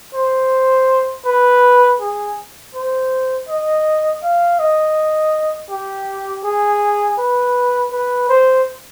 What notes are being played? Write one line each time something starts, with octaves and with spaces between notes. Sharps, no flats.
C5
B4
G#4
C5
D#5
F5
D#5
G4
G#4
B4
B4
C5